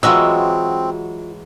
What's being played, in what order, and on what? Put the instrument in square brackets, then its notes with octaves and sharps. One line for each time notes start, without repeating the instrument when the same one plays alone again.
[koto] E3 F#3 G#3 [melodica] C4 [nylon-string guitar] F4 F#4 D#5 [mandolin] E6